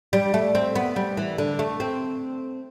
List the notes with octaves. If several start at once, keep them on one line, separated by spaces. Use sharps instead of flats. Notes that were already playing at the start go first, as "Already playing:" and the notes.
G3
A3
C4
B3
G3
E3
D3
A3
C4